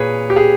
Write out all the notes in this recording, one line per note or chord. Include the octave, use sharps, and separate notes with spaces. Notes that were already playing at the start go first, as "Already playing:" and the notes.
Already playing: A#2 G#4 B4 C#5
G4
G#4